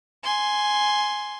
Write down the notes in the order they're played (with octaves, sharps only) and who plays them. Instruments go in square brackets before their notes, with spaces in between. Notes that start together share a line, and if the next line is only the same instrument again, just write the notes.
[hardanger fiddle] G#5 C6